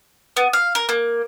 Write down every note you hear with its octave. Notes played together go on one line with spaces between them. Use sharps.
B3
F5
A#4
A#3